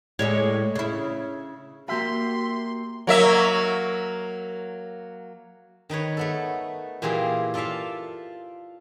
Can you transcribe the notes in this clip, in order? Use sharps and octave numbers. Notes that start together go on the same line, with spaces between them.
A2 G3 G#3 C#5
C#3 E4
A#3 F#4 G4 E5 C6
F#3 A#3 E5
D#3 D#4 B4 C#5
A3 B3 A4
A#2 E3 A#3 F4 G4 G#4
F4 A4 D5 E5 F5